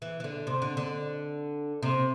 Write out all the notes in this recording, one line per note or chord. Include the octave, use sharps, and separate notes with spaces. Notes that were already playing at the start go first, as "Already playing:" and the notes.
E3
E3
D3
C3
D3
D3
C3